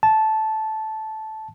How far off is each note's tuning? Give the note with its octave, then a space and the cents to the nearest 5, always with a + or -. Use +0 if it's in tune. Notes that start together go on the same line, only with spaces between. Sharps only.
A5 -10